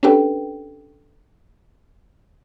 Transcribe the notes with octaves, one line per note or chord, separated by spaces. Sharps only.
C#4 D4 G4 A4 B4 G5